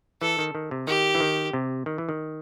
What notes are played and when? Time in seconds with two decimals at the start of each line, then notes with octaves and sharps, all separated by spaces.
0.21 E3 A4
0.39 D#3
0.55 D#3
0.71 C3
0.87 D#3 G4
1.15 E3
1.20 D#3
1.53 C3
1.86 D#3
1.98 E3
2.09 D#3